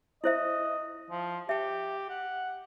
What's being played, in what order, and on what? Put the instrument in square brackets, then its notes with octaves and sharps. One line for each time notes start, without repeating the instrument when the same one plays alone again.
[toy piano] E4 C5 E5 [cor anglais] D#5
[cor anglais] F3
[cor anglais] G4 [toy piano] E5 G5
[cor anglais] F#5